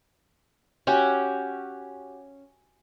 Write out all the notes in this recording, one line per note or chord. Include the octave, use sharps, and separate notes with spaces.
C#4 F#4 G4